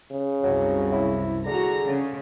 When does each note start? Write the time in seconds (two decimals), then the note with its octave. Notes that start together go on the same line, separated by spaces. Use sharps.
0.12 C#3
0.43 C2 F#2 F#3
0.92 E4
1.46 D3 F#4 G#4 A#5
1.84 C#3